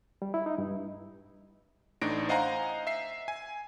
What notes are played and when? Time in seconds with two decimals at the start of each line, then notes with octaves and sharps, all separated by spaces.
0.22 G3
0.34 E4
0.46 D#4
0.58 G2
2.01 A1 A2 D4 D#4 A#6 D7
2.29 C5 D#5 F5 F#5 G#5 A#5
2.87 E5 C7
3.28 G#5